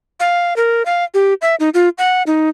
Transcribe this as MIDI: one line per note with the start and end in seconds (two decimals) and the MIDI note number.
0.20 0.56 77
0.56 0.85 70
0.86 1.04 77
1.14 1.34 67
1.42 1.55 76
1.60 1.69 63
1.74 1.89 65
1.98 2.23 78
2.27 2.49 63